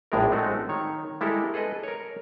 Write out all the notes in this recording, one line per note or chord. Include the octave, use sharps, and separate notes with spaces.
A#1 A2 G#3 D4 D#4 A#4
G#3 A3 C4 D#4 F#4
D#3 C#5
G3 G#3 E4 G4 A4 A#4
G#4 A4 B4 D#5
A#4 C#5